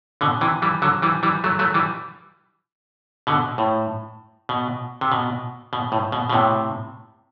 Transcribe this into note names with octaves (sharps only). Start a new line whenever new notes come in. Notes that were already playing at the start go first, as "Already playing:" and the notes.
B2 D3
C3 E3
E3 G3
D3 F#3
E3 G3
E3 G3
F#3 A3
F#3 A3
E3 G3
B2 D3
A2
B2
C3
B2
B2
A2
B2
B2
A2 C3